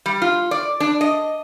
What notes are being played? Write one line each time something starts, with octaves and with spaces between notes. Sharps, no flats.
G3
F4
D5
D4
D#5